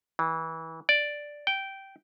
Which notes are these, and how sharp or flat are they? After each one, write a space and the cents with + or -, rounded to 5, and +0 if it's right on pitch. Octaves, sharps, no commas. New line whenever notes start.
E3 -25
D5 +0
G5 -10